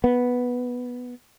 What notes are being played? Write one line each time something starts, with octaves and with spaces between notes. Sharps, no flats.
B3